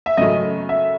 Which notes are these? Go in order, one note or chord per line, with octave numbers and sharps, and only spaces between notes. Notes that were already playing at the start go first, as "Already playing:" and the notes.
E5
F#2 C#3 F#3 A3 C#4 D#5
E5